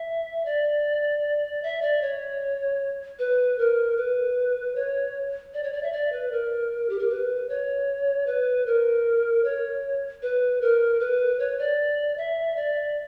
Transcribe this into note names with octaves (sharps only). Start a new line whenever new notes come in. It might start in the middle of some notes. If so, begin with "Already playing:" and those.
Already playing: E5
D5
E5
D5
C#5
B4
A#4
B4
C#5
D5
C#5
D5
E5
D5
B4
A#4
G4
A#4
B4
C#5
B4
A#4
C#5
B4
A#4
B4
C#5
D5
E5
D5